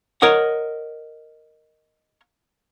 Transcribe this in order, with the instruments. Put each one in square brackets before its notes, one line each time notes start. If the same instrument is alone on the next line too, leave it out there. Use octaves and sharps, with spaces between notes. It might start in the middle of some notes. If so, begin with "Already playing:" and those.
[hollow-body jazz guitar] A#4 C#5 D#5 F#5